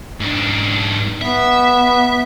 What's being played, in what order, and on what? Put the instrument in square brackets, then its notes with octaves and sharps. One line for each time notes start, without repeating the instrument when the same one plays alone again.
[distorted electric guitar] G#2 D4
[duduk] B3 [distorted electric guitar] E5